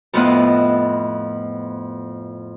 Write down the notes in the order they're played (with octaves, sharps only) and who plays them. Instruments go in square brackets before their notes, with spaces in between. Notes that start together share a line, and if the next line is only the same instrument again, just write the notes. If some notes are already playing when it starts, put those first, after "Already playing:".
[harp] F2 A2 B3 F4 D#5 F#6